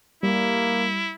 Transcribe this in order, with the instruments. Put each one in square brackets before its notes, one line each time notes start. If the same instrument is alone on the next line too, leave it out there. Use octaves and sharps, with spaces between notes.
[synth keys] G3 [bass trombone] A#3 [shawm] E4